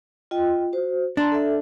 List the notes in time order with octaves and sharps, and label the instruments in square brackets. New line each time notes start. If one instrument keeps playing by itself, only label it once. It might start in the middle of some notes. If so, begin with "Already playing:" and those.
[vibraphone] F4 D#5 G5
F#4 C5
[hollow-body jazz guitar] D4 [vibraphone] A5 A#5 C6
[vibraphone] A4 E5